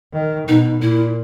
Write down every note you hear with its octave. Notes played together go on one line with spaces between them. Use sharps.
D#3
B2 D#4
A#2 E4